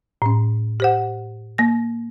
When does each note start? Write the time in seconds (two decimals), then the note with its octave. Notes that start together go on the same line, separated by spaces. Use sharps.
0.22 A2 C#4
0.80 G4 C5 F#5
1.58 A#3 A#6